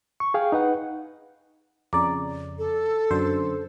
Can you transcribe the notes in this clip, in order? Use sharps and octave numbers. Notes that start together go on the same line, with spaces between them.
C#6
G#4 F5 G5
D#4 B4 F#5
F2 C#3 D5 A#5 D6
A4
F#2 D3 C5